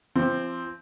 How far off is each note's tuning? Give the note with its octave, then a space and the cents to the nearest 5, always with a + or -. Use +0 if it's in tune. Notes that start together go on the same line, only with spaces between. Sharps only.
F3 -35 C4 +0